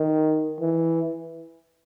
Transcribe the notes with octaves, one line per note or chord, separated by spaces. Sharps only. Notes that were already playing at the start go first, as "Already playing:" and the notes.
Already playing: D#3
E3